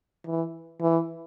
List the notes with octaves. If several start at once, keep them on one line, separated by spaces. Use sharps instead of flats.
E3
E3